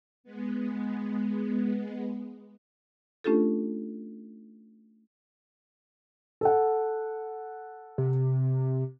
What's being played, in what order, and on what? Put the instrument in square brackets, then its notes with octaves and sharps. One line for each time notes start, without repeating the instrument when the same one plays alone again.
[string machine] G#3 B3
[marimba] A3 C#4 D4 F4 G4 A4
[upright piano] A4 F#5
[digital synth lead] C3